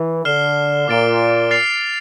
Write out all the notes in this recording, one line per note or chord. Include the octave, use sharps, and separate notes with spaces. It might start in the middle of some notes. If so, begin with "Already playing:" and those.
Already playing: E3
D3 F6 C7 E7 G7
A#2 D6 F6 A6 D7 G7
F6 A6 C7 F7